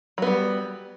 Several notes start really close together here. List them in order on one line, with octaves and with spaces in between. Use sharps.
F#3 B3 G3